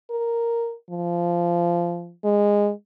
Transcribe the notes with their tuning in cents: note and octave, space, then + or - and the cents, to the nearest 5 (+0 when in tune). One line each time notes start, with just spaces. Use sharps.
A#4 +0
F3 -15
G#3 -15